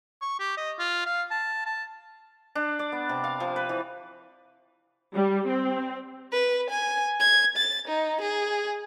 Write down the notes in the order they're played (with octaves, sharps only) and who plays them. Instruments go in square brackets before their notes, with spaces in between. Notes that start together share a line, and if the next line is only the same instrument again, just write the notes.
[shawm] C#6
G4
D#5
F4
F5
A5
A5
[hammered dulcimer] D4
D5
B3
C3
F5
F3
B4
E3
[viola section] G3
C4
[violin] B4
G#5
G#6
A6
D#4
G#4